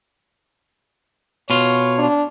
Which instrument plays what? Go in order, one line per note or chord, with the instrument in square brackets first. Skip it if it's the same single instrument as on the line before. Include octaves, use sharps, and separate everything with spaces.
[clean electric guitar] B2 F4 [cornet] C#5
[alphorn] D4